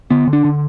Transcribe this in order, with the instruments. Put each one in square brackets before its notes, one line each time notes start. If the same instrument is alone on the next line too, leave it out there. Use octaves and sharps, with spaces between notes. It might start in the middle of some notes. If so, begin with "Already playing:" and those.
[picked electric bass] D3 B3
D3
D4
D3